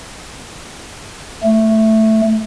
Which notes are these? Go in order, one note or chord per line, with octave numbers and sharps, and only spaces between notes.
A3